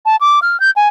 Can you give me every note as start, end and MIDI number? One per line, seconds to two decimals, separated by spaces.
0.06 0.16 81
0.21 0.40 86
0.42 0.59 89
0.60 0.70 91
0.76 0.88 80